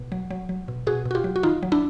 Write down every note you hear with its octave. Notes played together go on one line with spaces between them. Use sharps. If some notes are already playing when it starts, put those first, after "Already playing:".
Already playing: B2
F#3
F#3
F#3
B2
B2 F#4 G#4
B2
F#4
F4 G4
F#3
F#4
D#3 D#4 F4
F#3
D4 E4